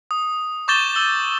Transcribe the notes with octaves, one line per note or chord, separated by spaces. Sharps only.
D#6
C#6 D6 G6 A6 E7 G7
E6 G7